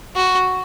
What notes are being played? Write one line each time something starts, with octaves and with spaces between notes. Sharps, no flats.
F#4